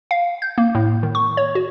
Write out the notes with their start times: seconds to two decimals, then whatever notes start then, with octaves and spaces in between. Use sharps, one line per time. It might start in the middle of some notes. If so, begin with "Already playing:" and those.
0.11 F5
0.42 G6
0.58 A#3
0.75 A2
1.03 D#3
1.15 C#6
1.37 C#5
1.55 F#4